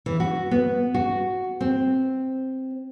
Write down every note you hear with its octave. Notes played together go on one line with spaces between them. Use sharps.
E3
F#4
B3
F#4
C4